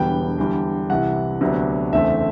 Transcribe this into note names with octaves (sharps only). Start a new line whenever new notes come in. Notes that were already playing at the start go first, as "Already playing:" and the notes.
Already playing: E1 E2 D3 G3 B3 G5
E2 D3 G3
C2 C3 E3 F#5
D2 C3 F#3 B3 D4
F#1 E2 D3 A3 C4 E5